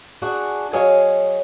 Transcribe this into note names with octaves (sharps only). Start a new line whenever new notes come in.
D4 F#4 G#4
F#3 G#4 C#5 D#5 F5